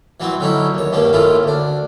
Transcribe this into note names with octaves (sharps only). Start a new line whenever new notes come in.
E3 F#3 B3 C4
D3 F#3 C#4 D#4 E4
D#2 C#5
G2 B2 D#3 A#3 C#4
A2 D#3 C#4 E4 F4
D2 D4